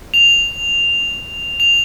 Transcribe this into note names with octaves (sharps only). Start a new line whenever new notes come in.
F7
F7